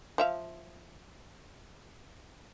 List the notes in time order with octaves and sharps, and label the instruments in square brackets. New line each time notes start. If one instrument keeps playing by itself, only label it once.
[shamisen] F3 E5 F5